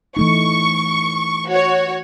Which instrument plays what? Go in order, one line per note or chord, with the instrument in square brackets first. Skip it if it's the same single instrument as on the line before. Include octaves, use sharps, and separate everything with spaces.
[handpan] E3 A3 D#4 [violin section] C#6
[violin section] F#4 C#5